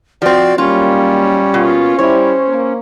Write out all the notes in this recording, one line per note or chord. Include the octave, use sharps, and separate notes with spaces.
F3 C4 F#4 D5
D#3 F#3 G3 A#3 C#4 F4
B2 A#3 B3 F4
G3 E4 C5 C#5
A#3